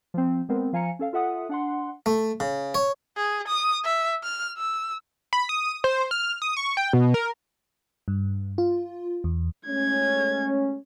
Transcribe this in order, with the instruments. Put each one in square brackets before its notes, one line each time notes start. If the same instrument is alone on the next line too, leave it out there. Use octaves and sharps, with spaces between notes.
[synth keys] F3 C4
G#3 B3 C4 A#4
F3 F5 G#5 A#5 C#7
C#4 A4 F5
F4 A4 E5 F#5 D#6
D4 F#5 C6
[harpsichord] A3
C#3
C#5
[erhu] G#4
D#6
E5
F6
E6
[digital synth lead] B5
D#6
C5
F6
D#6
C#6
G5
B2
A#4
[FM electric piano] G2
F4
E2
[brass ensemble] G#3 A3 C#4 [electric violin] G#6